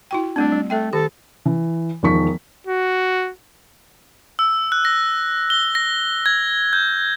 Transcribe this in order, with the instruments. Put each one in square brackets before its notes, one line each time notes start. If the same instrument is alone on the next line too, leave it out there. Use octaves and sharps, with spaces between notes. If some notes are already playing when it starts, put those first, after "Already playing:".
[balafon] E4 F#4 G5
[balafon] G3 A3 C4 [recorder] D4
[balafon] G3
[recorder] A3 [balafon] A4 E5 G5
[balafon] D#3 G4 [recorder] A4
[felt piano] E3
E1 D#3 F3 C#6 B6
[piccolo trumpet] F#4
[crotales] E6
F#6
A#6
G7
A#6
G#6
G6